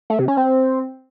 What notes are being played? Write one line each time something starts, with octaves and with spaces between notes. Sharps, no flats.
A3
C3
C#4
C4